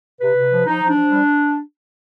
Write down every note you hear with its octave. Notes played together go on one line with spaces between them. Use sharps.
C3 B4
C3
F3
F3 D#4
F3
D4
F3
G3